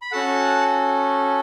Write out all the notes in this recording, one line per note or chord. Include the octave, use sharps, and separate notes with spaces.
B5
C#4 F#4 A4 F#5 A5